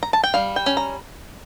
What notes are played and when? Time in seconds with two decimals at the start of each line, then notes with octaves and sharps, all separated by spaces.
0.03 A#5
0.13 A5
0.24 G5
0.34 G3 F5
0.56 G5
0.66 C#4
0.77 A#5